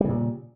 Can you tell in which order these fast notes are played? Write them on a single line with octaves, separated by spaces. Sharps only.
G3 C#3 A#2